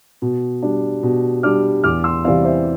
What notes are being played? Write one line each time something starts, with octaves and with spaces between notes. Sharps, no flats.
B2
G3 D4
B2
G3 D4 D6 F6
E2 D6 F6
C6 E6
C3 E3 G3 C4 D5 F5
C5 E5